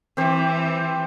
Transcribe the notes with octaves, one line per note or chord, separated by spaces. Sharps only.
E3 C4 G4 C5